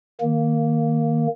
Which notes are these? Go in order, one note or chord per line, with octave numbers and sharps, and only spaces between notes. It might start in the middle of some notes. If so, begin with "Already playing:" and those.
D#3 A#3